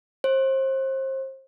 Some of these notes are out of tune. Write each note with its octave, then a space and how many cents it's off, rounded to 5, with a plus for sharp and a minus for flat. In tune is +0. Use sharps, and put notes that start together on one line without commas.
C5 +30